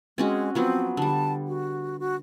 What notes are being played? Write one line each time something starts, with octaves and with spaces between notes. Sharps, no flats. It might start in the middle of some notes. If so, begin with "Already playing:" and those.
G#3 C4 C#4 F#4
F3 F#3 B3 C4
D3 G3 A5
F#4
F#4